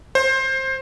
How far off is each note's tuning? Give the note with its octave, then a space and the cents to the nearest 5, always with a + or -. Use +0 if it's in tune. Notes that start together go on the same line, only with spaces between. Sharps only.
C5 +20